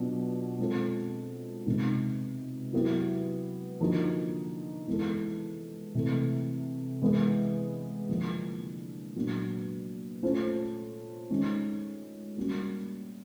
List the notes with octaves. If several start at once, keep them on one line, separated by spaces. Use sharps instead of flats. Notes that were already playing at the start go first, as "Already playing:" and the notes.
Already playing: B2 F#3 D4 F4
G#3 C4 F4 A4
C3 D#3 G#3 B3 D#4
F#3 B3 E4 G4
D3 F3 A#3 D#4 F#4
E3 G#3 B3 E4 A4
C3 E3 A3
E3 G#3 B3 E4
D3 F3 A#3 D4
A#2 F#3 B3 D4
A3 C#4 F4 A4 C5
D#3 G#3 C#4
G3 A#3 C#4 F#4